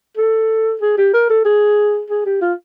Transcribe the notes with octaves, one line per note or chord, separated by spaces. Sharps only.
A4
G#4
G4
A#4
A4
G#4
G#4
G4
F4